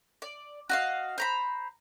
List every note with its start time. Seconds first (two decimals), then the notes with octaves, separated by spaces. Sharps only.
0.22 D5
0.69 F#4 D#5 F5
1.18 C5 A#5 B5